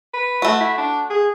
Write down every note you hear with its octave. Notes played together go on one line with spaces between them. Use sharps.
B4
A3 F#4
E4
D4
G#4